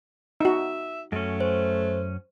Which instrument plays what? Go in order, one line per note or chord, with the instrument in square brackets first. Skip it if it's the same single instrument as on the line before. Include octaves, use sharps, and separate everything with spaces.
[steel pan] D#4 F#4 [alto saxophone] E5
[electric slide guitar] F#2 C#4 [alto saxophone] A3
[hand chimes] C5